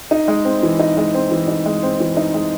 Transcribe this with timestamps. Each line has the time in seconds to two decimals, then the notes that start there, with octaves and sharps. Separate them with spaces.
0.11 D#4
0.28 G#3
0.45 C4
0.63 E3
0.79 D#4
0.97 G#3
1.14 C4
1.31 E3
1.48 D#4
1.66 G#3
1.83 C4
2.00 E3
2.17 D#4
2.34 G#3